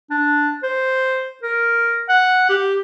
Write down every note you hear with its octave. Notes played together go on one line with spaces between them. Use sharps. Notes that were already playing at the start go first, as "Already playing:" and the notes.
D4
C5
A#4
F#5
G4